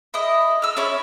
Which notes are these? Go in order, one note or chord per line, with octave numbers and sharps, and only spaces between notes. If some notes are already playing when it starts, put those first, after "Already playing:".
E4 D#5
E6 F6
C#4 E4 C#5